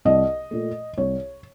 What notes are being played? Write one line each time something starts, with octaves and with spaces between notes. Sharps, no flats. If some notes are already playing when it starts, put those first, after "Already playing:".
C2 D#5
A#2 A3
C2 C#5